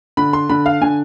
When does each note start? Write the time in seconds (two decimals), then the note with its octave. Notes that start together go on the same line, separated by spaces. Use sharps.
0.17 D3 B5
0.33 C6
0.49 D3 B5
0.66 F5
0.81 D3 G#5